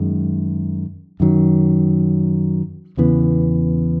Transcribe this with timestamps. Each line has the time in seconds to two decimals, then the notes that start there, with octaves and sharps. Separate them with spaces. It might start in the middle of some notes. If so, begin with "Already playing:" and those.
Already playing: F#2 D#3 G#3
1.20 F#2 D#3 F#3
2.97 E2 C#3 E3 B3